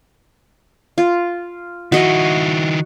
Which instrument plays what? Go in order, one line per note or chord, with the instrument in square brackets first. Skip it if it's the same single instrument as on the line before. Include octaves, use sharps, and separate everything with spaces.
[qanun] F4
[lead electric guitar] D#3 E4 [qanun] F#4 D#5